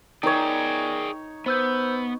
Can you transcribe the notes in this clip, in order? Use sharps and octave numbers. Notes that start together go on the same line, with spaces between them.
D#4 G#4 A#4 C#5 D5 G5
B3 C5 E6 G6